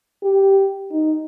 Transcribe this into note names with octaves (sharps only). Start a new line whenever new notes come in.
G4
D#4